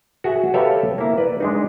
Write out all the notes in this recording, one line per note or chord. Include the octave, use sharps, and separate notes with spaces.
F#4 G#4 E5
G4 A4 B4 C#5 E5 F5
A#3 E4
B4 D5
G#3 D4 D#4